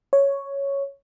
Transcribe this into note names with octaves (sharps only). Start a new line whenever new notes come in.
C#5